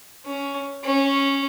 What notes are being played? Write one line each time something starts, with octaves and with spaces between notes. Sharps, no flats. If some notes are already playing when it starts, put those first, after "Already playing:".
C#4
C#4